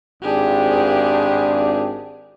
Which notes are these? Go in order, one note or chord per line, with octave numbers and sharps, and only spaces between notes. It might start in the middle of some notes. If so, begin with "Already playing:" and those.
G#1 D4 G4 G#4